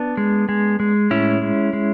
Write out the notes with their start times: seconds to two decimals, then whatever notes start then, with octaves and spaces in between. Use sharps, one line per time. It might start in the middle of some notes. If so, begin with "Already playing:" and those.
Already playing: B3 D4
0.17 G#3
0.49 G#3
0.80 G#3
1.10 A2 C#4 E4
1.42 G#3
1.73 G#3